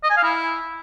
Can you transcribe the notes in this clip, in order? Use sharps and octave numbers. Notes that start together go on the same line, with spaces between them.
D#5
G#5
F5
E4